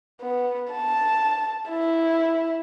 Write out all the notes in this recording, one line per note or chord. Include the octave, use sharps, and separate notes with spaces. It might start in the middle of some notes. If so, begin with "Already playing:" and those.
B3
A5
E4